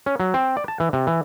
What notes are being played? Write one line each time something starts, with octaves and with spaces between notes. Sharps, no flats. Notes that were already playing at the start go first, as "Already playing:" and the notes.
C#4
F#3
C4
D5
A5
E3
C3
E3